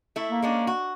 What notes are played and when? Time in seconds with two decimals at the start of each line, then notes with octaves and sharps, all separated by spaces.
0.16 A3 E4
0.30 A#3
0.42 G#3 C#4 D4
0.67 F#4